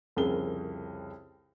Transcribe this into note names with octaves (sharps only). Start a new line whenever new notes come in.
C2 F2 C#3 G#4 A#4 G7